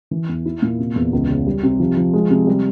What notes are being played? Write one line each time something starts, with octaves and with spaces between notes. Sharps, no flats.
E3
E2
E4
A#2
C3
E2
C#2
C#3
G3
C3
F3
F3
G#3
C3
G3